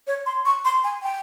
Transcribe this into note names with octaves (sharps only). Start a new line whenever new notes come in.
C#5
C6
C#6
C6
G#5
G5